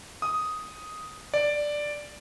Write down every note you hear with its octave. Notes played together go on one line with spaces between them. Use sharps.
D#6
D5